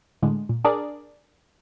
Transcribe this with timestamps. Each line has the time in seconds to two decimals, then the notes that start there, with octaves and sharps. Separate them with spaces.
0.22 A2 D3 G#3
0.49 A#2
0.64 D4 G#4 A#4 D5